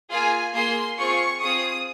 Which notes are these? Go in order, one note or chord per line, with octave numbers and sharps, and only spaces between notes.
A#3 F4 G#4 G#5
A#3 F4 G#4 C6
C4 F4 G#4 C#6
C4 F4 G#4 D#6